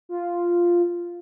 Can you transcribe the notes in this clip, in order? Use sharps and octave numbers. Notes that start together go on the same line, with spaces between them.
F4